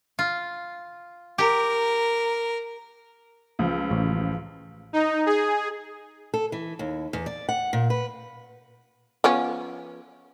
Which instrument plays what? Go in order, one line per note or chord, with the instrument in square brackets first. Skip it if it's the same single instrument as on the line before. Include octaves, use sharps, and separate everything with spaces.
[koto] F4
[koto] G4 [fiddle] A#4
[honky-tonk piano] C#2 F3
[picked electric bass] A1
[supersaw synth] D#4
G#4
[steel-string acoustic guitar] A4
E3
D#2
E2
D5
F#5
A#2
B4
[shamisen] F3 B3 C#4